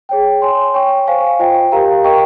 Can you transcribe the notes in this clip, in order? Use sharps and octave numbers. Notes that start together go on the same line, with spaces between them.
G#4 C#5 G5
C#5 G#5 C6
C#5 G5 C#6
C5 F5 G#5 C#6
F4 C5 D#5 G5
G4 A#4 F5 A#5
A#4 D#5 G5 A#5 C#6